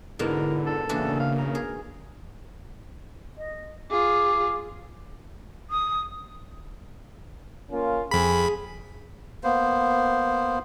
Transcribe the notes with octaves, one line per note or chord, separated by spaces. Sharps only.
G#2 B2 D3 A#3 E4 A#4
D3 A4
C#3 E3 A#3 D4 F#4
F5
A#4
G#4
D#5
F4 G#4 D6
D#6
A#3 C#4 F4
F2 G#4 B5
A#3 B3 C5